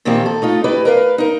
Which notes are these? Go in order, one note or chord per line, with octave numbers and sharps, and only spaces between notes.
A#2 D#3 F3 A#3 C4 G4
A4
A3 D#4 F4
E4 G4 B4 D#5
A#4 B4 D#5 F5
D#4 A#4